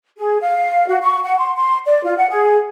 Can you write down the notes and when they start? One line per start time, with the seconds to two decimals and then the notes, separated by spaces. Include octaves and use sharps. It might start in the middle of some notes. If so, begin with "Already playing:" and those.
0.18 G#4
0.41 F5
0.88 F#4
1.02 C#6
1.24 F#5
1.38 C6
1.57 C6
1.85 D5
2.04 F4
2.17 F#5
2.30 G#4